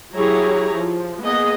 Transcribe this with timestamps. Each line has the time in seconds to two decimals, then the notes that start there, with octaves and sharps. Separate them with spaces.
0.14 F#3 E4 G4 G#4 C#5 A#5
0.75 F3
1.21 A#3 B3 G#4 D#5